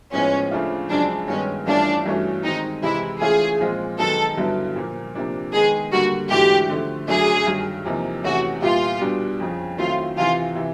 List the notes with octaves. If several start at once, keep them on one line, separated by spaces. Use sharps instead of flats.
A2 F3 G#3 B3 C#4
C#3 F3 A3 D4 F4
F#2 C#3 F3 G#3 D4
G2 D#3 G#3 B3 C#4
G2 E3 A3 C#4 D4 F4
G2 E3 A3 C#4 F#4
D#3 G#3 C4 D#4
C3 E3 G#3 C4 D#4 E4
E3 A3 C#4 F4 G#4
A#2 F3 G#3 C4 F4
F#2 D#3 G#3 B3 D#4 A4
G2 D3 F#3 B3 E4
A#2 F3 A#3
C3 F3 A#3 D4
D#3 G#3 B3 D#4 G#4
D3 G3 A#3 F#4
G#2 E3 A3 D4 F#4 G4
D3 F3 A3
F#2 C#3 F#3 A3 D4 G#4
G2 D#3 F#3
E2 C3 F3 A#3 D#4
E2 C3 E3 A3 C#4 F#4
A#2 G3 B3 E4 F4 G4
B2 G3 B3 D4
F2 C#3 F3
D#3 F#3 A3 C4 E4 F4
E2 C3 E3 F4
C3 E3